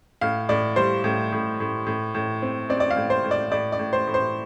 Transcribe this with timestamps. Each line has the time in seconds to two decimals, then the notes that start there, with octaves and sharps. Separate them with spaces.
0.21 A2 F5
0.49 A2 D5
0.76 G3 C5
1.04 A2
1.32 A2
1.60 A2
1.87 A2
2.14 A2
2.42 C4
2.69 C4 D5
2.80 D5
2.90 F5
2.96 A2
3.10 C5
3.24 A2
3.31 D5
3.51 A2 D5
3.72 D5
3.79 A2
3.93 C5
4.07 A2
4.14 C5